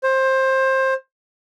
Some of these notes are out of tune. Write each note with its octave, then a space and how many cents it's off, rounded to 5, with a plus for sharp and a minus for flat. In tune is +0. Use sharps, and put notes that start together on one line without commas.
C5 +20